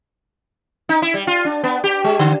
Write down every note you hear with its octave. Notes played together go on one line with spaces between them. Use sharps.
D#4
E4
G3
F4
D4
B3
G4
G#3
D3